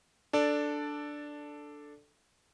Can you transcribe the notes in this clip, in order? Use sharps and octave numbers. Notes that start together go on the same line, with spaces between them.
D4 A4 D5